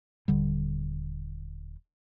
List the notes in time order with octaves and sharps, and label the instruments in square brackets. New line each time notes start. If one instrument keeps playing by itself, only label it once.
[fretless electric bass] D#1 D3 G3